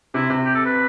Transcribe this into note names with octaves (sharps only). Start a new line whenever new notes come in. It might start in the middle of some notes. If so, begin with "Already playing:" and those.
C3 E4
C3
G4
A4
B4